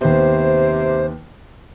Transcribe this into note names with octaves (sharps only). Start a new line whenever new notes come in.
D#2 C3 B3 C5